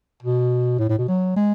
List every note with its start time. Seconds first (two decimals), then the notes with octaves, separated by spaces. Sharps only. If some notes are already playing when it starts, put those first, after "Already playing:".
0.23 B2
0.79 A2
0.90 A2
0.98 B2
1.08 F#3
1.36 G#3